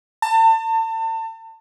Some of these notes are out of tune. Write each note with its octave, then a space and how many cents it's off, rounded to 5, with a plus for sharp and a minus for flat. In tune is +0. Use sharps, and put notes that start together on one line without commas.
A5 +35